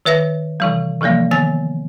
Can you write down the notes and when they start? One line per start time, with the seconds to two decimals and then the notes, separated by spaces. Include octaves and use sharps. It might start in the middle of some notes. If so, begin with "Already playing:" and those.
0.05 D#3 B4 E5 A#6
0.60 C3 E3 G3
1.01 C3 E3 F3 G3 A#3
1.31 D#3 B3 A6